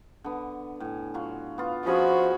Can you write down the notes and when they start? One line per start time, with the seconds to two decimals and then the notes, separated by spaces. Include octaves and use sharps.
0.24 D3 B3
0.80 A2 G#5
1.14 F#3 F4
1.58 B3 F4
1.86 F3 C#4 F#4 G#4 B5